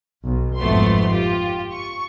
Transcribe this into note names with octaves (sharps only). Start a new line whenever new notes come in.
B1
G1 F2 G#2 A3 B3 C6
F4 G4
C#6